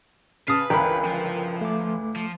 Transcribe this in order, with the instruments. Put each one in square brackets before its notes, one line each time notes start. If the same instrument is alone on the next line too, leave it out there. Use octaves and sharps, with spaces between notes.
[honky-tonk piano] C#3 [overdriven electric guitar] B4 [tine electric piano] A5 F6 [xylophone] D#6 C7
[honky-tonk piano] G1 C#2 E3 [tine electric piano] A#4 G5 [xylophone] A#5 B5
[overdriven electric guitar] F3
[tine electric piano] A3 D6
[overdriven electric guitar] F3